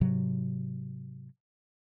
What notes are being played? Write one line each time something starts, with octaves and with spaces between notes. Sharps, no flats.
G#2 C3 F#3